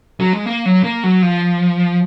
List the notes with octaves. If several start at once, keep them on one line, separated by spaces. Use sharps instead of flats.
F#3
G#3
A#3
F#3
A#3
F#3
F3